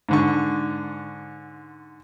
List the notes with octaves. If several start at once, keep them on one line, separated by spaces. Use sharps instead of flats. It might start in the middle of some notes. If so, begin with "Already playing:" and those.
G#2 D3 C#6